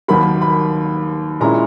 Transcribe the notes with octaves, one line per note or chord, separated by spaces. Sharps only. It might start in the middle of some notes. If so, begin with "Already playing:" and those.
D#2 D#3 F#3 A#3 B5
B5
A#2 G#3 C#4 E4 A#5